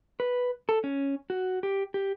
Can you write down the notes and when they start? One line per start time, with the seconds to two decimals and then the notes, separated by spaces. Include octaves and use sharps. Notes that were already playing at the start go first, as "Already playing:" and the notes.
0.20 B4
0.69 A4
0.84 C#4
1.30 F#4
1.63 G4
1.94 G4